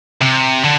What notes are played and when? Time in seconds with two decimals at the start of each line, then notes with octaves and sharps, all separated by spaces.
0.21 C3
0.63 D3